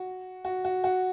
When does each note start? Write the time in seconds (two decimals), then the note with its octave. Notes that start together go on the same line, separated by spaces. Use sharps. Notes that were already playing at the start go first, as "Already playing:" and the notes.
Already playing: F#4
0.45 F#4
0.65 F#4
0.84 F#4